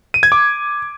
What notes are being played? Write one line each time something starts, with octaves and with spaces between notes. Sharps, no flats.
D#7
G#6
D6